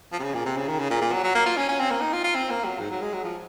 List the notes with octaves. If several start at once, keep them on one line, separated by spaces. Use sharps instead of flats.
F3
C3
C#3
A#2
C3
C#3
D#3
C#3
A#2
A#2
F#3
F#3
A#3
F4
C#4
C#4
C4
A#3
D#4
F4
F4
C4
A#3
F#3
G#2
F#3
G#3
F#3
F3